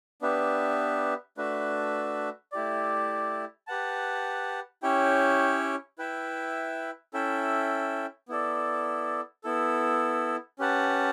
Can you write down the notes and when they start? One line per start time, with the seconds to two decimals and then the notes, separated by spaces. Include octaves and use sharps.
0.21 B3 D4 G4 B4 E5
1.37 A3 D4 F#4 B4 E5
2.52 A3 E4 G4 D5
3.67 G4 B4 F#5 A5
4.83 C#4 E4 G4 C#5 G5
5.98 E4 B4 E5 G5
7.13 C#4 E4 A4 E5 G5
8.28 B3 E4 A4 D5
9.44 B3 E4 A4
10.59 C#4 G4 B4 F#5 A5